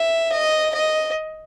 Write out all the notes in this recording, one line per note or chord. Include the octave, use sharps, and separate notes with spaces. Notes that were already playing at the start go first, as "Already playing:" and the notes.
Already playing: E5
D#5
D#5